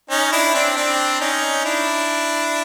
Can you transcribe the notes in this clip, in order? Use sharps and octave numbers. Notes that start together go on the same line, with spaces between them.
C#4 D#4
D4 E4
C4 D4
C4 D4
C#4 D#4
D4 E4